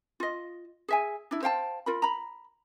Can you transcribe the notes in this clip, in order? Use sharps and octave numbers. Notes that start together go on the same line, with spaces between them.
F4 D#5
G#4 E5 G#5
D4 E4
C5 F5 G5 A5
F4 A#4 B5
A#5 B5